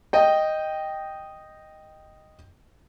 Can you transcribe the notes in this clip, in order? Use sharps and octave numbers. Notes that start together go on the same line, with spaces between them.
D#5 G5